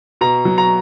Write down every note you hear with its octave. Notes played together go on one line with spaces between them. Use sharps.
B2 A#5
F#3
A#5